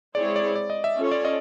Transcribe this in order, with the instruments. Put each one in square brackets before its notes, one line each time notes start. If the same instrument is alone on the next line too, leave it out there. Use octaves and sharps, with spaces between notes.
[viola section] G#3 C4 E4 G#4 C#5 [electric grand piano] D5
[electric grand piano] D5
D5
D#5
E5
[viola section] C#4 F4 A4 C#5
[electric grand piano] D5
D#5